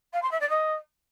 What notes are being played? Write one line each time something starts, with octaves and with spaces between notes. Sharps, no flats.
F5
C6
E5
D5
D#5